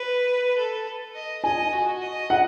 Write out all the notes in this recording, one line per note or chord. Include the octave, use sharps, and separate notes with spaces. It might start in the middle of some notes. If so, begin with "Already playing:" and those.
Already playing: B4
A4
D#5
D#5 G#5
F#4
D#5
F#5